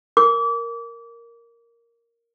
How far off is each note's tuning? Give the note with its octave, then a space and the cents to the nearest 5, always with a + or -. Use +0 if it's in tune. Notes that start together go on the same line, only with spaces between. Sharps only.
A#4 +0 D6 -30